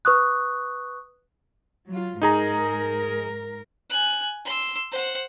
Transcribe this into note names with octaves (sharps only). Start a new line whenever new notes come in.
B4 C#6 D#6 F#6
F#3 F4
G#2 D#4 G#4 A#4 A#5
G#5 F#6
C6 E6
C5 F#5